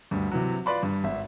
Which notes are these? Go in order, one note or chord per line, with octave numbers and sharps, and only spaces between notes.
D2 G2
C3 E3 F#3
F4 B4 D5 B5 C6
G2
G#1 E5